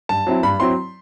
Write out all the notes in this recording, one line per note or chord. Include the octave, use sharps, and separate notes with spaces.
G2 A5
F#3 C4 E4
G2 B5
F#3 C4 E4 C6